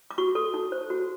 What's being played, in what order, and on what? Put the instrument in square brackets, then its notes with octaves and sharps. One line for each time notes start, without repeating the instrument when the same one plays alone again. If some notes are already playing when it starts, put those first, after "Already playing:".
[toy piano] D6
F#4 C#6
A4
D#4
C5
F#4